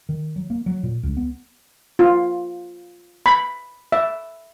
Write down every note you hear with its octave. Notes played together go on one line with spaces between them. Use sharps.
D#3
F#3
A#3
F#3
A#2
C#2
B3
F4
B5
E5